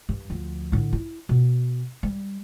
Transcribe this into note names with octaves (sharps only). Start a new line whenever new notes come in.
G2
D2 F3
A2 D3
E4
B2
G3